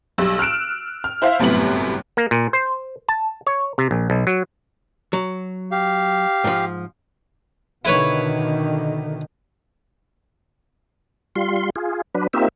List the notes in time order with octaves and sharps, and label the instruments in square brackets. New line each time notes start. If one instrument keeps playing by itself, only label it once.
[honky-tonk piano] B1 G3 E6
F6 F#6 D7 E7
F6
E4 C5 E5 F5
G1 F#2 A2 C3 B3 F#7
[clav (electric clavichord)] A#3
A#2
C5
A5
C#5
C3
A#1
B1
F#3
[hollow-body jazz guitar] F#3
[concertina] G4 F5
[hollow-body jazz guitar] G#2 F3
[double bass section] B2 D3 D#3 [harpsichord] E4 B4 C#5
[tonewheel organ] G3 F4 C6
F4 G#4
F#3 D4 B4
A#3 C4 D#4 F4 G4 E5